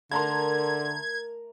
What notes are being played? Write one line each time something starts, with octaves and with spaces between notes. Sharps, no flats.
D3 A3 A#4 A5 A#5 C6 G#6